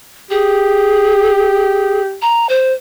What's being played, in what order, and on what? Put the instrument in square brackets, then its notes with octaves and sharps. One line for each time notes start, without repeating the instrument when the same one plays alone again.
[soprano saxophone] G4 [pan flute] G#4
[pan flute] A#5
C5